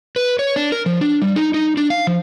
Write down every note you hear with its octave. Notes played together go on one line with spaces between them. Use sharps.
B4
C#5
D4
A#4
F3
D4
G3
D#4
D#4
D4
F5
F3